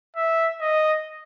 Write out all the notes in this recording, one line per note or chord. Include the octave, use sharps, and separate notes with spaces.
E5
D#5